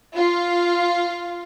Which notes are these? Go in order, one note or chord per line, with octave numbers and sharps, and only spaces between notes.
F4